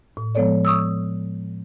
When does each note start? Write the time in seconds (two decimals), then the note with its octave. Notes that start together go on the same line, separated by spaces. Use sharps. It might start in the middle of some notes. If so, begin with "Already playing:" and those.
0.17 A2
0.35 F3 G#3 B3 A4 C#5 D5
0.65 C#6 D#6 E6